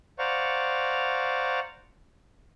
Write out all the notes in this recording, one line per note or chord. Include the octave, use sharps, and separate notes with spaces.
C5 D5 F5 F#5 A#5 C#6